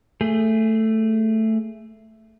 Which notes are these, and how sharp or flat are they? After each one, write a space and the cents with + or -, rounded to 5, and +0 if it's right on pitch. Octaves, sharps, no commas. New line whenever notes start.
A3 +5 G#4 +0